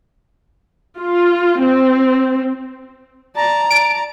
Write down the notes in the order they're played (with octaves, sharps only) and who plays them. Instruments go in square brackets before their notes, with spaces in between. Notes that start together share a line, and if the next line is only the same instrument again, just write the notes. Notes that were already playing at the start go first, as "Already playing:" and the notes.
[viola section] F4
C4
[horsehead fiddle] D5 A5 [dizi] A#5
[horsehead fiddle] D5 A5 [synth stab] D7